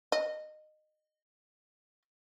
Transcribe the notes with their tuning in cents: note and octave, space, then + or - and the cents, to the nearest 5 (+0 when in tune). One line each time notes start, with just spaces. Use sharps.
D#5 -20